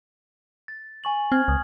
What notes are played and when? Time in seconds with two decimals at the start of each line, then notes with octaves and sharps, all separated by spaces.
0.68 A6
1.04 G#5 C#6 F#7
1.32 C4 F6 G#6
1.48 C#2 D#6